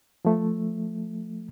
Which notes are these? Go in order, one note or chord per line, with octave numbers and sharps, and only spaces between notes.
F3 A3